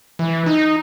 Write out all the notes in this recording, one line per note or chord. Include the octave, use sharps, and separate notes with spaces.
E3
D#4